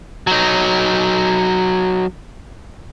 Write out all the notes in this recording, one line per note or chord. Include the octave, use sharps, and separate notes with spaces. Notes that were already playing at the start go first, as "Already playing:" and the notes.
F#3 D#4